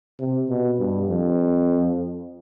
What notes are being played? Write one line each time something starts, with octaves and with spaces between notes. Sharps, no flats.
C3
B2
G2
F2